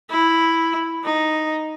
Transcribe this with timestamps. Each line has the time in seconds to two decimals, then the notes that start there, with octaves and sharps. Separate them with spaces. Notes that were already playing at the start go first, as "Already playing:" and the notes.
0.10 E4
1.04 D#4